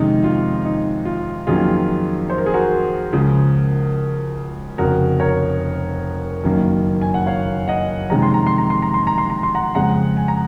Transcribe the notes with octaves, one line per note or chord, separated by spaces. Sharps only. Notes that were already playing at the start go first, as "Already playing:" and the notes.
Already playing: F2 C3 D#3 G#3 C#4 D#4
F4
D#4
F4
F2 D#3 F#3 A#3 C#4 F4 G#4
C5
A#4
G#4
F#4 A#4
C#2 C#3 F3
F1 F2 C#3 F#4 A#4
A#4 C#5
F#1 F#2 D#3 A#3 C#4
G#5
F#5
C#5 F5
D#5 F#5
F2 C3 D#3 G#3 C#4 A#5
C6
A#5
C6
A#5
C6
A#5
C6
A#5
C6
A#5
C6
F#5 A#5
F2 C#3 G#3 F#5 A#5
G#5
A#5